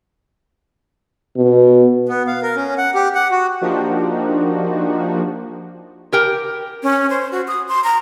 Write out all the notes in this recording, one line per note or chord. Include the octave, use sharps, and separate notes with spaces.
B2
B3
F5
A#4
C#4
F#5
G4
F#5
F#4
F3 A#3 D4 D#4 F#4 G4
G4 A#4 G5
C#4
C5
F#4
D#6
C6
A#5